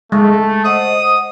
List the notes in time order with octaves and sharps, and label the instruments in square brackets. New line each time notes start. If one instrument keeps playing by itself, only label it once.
[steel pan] G#3 [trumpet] A3
[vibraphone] C5 D#5 F#5 [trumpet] D#6